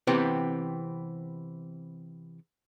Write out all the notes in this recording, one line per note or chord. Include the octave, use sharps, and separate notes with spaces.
C3 E3 B3 C4 G4